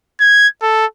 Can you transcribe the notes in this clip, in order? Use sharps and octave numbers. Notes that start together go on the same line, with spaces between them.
G#6
A4